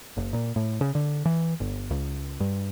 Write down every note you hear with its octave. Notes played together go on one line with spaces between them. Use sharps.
F#1
A#2
A2
C#3
D3
E3
G1
C#2
G2